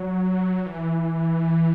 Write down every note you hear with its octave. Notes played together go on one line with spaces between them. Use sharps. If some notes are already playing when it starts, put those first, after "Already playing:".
Already playing: F#3
E3